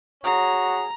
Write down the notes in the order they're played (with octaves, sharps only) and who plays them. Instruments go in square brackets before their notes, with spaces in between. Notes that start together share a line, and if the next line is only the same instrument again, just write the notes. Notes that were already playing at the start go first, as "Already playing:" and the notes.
[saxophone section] F#4 G#4 C#5 [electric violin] A#5